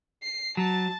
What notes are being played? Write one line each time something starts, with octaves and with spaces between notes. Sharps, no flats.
C7
F#3 A5 A6